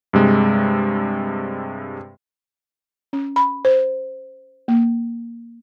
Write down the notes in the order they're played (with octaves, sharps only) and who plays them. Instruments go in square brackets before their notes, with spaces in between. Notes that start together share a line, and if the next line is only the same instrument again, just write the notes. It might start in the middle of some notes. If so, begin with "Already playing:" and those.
[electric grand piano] G2 C3 G#3
[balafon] C#4
B5
C5
A#3